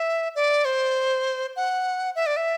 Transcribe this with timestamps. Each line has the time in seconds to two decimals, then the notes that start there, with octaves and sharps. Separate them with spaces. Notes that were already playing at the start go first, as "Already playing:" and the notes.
Already playing: E5
0.35 D5
0.65 C5
1.56 F#5
2.16 E5
2.26 D5
2.37 E5